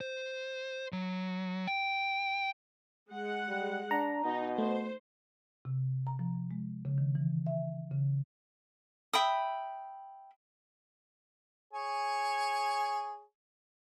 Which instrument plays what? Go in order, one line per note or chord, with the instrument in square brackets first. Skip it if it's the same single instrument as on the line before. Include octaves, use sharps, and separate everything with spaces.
[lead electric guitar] C5
F#3
G5
[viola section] G#3 F#5
[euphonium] G3
[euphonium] D4 [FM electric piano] A#5
[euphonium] B2 [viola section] D#4
[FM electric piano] A3 [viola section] C5
[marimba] C3
A#5
F3
G#3
C#3
D#3
E3
E5
C#3
[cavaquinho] E5 G5 B5 D#6
[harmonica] G#4 C#5 G#5